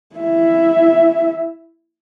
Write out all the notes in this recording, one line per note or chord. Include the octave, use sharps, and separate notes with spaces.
E4 E5